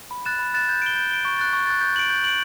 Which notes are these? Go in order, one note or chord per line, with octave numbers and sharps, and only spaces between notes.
B5
F#6 A6 E7
B5
F#6 A6 E7
G6
D7 G7
G6
D7 G7
C#6
F#6 A6
C#6
F#6 A6
G6
D7 F#7
G6
D7 F#7